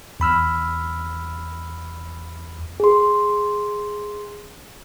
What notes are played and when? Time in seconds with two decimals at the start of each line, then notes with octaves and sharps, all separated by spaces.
0.20 E2 B5 E6 F6
2.80 G#4 C6